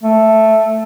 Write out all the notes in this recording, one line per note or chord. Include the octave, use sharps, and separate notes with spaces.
A3